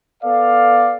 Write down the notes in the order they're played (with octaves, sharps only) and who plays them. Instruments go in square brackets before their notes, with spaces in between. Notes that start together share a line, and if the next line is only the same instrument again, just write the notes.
[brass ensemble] B3 A4 D5 F5